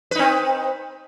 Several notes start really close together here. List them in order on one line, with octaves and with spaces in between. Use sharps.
B4 D#4 C4